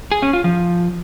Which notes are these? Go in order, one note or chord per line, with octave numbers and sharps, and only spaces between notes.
G#4
C#4
F4
F3